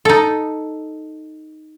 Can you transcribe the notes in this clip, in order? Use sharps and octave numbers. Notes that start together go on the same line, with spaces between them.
D#4 A4